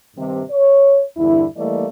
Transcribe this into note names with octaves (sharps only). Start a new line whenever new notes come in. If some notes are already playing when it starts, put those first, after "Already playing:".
G2 C3 D#3
C#5
E2 G2 D3 E4
E3 G3 A3 A#3 D5 D#5